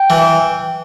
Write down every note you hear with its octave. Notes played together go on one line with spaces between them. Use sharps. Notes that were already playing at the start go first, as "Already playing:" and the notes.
Already playing: G5
E3